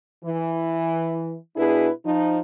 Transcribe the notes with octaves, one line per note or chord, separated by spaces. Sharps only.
E3
B2 D4 E4 G#4 B4
F3 D#4